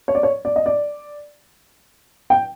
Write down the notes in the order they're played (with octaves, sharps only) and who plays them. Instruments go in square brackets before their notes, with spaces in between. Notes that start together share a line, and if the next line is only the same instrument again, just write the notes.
[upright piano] C#5
D5
C#5
D5
D#5
D5
G5